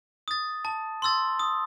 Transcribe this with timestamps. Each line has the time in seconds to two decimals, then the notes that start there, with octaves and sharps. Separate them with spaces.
0.28 D#6 A6
0.65 A5
1.02 C6 E6 A6
1.39 D#6